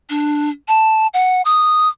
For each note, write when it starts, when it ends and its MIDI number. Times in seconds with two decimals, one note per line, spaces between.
0.10 0.50 62
0.68 1.07 81
1.14 1.42 78
1.45 1.88 87